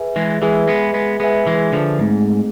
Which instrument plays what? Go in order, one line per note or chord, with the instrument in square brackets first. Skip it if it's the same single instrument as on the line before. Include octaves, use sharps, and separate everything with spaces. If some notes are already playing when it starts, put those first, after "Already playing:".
Already playing: [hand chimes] G#4 B4 E5 G#5
[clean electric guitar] E3 G#3
[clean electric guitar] E3 G#3 [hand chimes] G#4 B4 E5 G#5
[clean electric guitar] G#3 B3
G#3 B3
[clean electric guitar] G#3 B3 [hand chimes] G#4 B4 E5 G#5
[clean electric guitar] E3 G#3
D3 F3
[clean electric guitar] G#2 [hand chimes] A3 C4 G#4